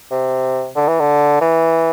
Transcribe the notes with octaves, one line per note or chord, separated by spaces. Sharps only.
C3
D3
E3
D3
E3